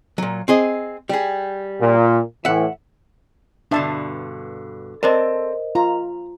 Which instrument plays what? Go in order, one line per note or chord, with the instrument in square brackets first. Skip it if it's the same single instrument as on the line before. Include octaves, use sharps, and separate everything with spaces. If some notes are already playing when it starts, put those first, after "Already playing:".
[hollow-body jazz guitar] A#2 F#3
C4 G#4 D#5
G3 G#4
[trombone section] A#2
[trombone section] A2 E3 [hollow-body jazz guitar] E5 F#5
[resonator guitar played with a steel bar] G2 B2 D3 [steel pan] D4 E5 A5
[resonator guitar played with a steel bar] C4 A4 A5 [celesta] A#4 C5 D#5 [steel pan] D5
[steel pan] F4 [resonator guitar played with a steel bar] A#5